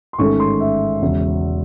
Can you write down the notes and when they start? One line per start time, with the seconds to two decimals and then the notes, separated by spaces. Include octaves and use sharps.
0.13 C6
0.19 A1 G#2 D#3 A3 C#4 C#6
0.40 C6
0.61 E5
1.02 E1 E2 C#3